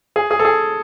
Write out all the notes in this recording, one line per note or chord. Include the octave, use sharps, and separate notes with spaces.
G#4
G#4
A4
G#4